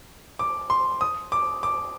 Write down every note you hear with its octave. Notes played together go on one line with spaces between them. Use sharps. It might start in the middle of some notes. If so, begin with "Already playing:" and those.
D6
C6
D#6
D6
D6